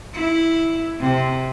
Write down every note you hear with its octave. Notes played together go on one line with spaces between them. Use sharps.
E4
C3